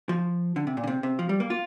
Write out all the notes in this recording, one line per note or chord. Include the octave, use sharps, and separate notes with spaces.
F3
D3
C3
A#2
D3
C3
C3
F3
G3
A#3
F4